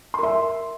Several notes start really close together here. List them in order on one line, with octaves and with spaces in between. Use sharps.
C6 A#4 E5